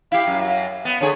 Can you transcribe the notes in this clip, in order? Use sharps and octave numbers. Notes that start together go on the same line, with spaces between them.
E4 G4 F5
F#2
F5
B3
D3 G#4 C#5